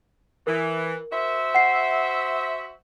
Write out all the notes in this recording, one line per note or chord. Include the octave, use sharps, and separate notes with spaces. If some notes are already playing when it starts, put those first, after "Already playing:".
E3 A#4
F#4 C5 E5
F#5 C7